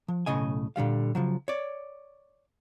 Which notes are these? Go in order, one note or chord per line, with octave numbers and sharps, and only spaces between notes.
F3
B1 A2 C#3 D#5 G#5
A#2 D3 G3 F5
C#3 F3 F#3
C#5 D5